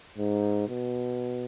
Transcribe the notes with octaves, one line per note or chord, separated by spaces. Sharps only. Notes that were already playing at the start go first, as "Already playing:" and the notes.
G#2
B2